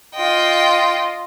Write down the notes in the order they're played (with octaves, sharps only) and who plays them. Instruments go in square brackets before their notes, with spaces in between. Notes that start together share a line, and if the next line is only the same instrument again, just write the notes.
[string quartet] F4 D#5 [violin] G5